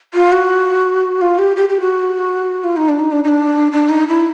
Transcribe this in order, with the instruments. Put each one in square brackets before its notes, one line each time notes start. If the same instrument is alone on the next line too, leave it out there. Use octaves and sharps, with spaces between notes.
[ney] F4
F#4
F4
G4
G4
G4
F#4
F4
D#4
D4
D#4
D4
D#4
D4
D4
D#4
E4